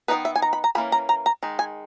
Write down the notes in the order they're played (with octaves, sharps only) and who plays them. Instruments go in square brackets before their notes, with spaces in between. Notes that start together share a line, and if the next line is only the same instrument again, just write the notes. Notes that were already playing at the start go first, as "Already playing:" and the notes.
[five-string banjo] D#3 G#3 B3 D#4 B4
E5
G#5
A#5
B5
A#5
E3 A#3 C#4 B5
A#5
A#5
A#5
D#3 G#3
G#5